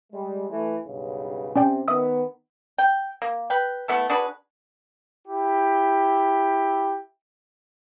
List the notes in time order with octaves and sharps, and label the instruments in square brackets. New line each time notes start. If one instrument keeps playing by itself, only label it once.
[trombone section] G3 G#3
E3 A3
B1 G2 C#3
[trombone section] C3 [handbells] C#4 D5 G5
[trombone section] D#3 B3 [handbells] E5 D#6 E6
[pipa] G5
A#3
B4 G5
A3 B3 E4 A4
D4 F#4 G#4 B4
[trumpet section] E4 G4